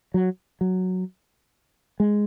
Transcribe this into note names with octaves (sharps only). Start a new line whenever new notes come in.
F#3
F#3
G#3